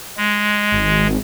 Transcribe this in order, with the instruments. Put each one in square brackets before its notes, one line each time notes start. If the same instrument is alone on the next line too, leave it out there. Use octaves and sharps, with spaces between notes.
[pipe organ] G#3
[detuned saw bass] G#1